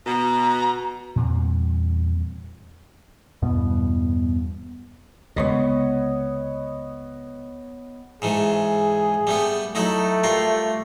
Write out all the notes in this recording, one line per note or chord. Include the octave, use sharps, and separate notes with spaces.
B2 A#5
E2 A#2 G3 C4
E2 G2 B2 B3
C#2 C3 B3 C#5 D#5
G#2 E3 A3 G#4
G3 A3 B3
F#3 A3 D#4 E4
G3 F4 A#4